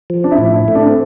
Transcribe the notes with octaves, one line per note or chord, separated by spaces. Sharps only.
F3
D4
E4
A2
E4
A3
D4
C4